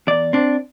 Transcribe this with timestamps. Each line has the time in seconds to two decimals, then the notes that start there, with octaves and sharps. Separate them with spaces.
0.07 E2 D5
0.33 C4 D4